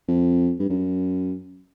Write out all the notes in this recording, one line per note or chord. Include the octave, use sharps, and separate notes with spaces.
F2
G2
F#2